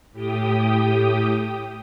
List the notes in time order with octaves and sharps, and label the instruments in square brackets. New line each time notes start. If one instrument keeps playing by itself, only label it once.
[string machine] A2 G4 G5 D#6